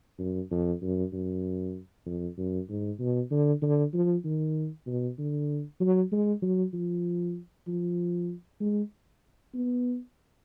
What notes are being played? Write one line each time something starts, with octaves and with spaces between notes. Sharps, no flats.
F#2
F2
F#2
F#2
F2
F#2
G#2
B2
D3
D3
F3
D#3
B2
D3
F#3
G#3
F#3
F3
F3
G#3
B3